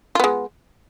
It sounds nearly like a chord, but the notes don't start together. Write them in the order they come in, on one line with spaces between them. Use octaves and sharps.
F4 B3 G#3